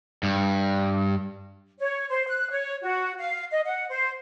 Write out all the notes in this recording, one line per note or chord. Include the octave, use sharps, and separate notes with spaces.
G2
C#5
C5
F#6
C#5
F#4
F5
D#5
F#5
C5